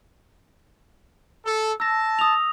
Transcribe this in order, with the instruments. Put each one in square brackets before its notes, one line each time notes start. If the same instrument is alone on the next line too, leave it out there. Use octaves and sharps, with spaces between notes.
[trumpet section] A4
[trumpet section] A5 [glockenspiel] E6 A#6
[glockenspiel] D#6 F7